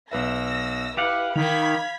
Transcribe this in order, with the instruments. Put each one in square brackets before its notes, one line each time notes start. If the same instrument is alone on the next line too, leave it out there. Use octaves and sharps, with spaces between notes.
[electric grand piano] B1 B4 E5 [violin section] E6 A#6
[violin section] E4 B4 [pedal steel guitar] G4 F5 F#5 [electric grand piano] D6
[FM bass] D#3 [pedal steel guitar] F5 [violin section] B5 G#6 B6